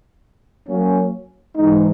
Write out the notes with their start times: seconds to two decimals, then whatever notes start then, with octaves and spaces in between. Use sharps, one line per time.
0.67 F#3 A#3 C#4
1.57 G#2 E3 G#3 D#4